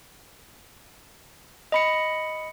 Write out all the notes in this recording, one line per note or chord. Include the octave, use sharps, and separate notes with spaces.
D#5 B5 C#7